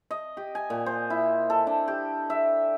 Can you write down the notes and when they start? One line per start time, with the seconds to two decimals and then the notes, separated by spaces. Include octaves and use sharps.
0.11 D#5
0.37 G4
0.55 G#5
0.70 A#2
0.86 C5
1.10 E4
1.50 A4
1.67 D4
1.88 G4
2.30 E5